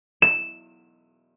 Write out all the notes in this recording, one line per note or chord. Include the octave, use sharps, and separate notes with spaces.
E7